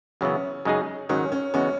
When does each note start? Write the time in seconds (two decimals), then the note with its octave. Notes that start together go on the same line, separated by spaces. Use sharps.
0.21 F#2 C#3 E3 B3 C#4
0.65 F#2 C#3 G#3 D#4 G#4
1.09 G#2 D#3 F#3 C#4
1.32 C#4
1.54 E2 C#3 G#3 B3 C#4 F#4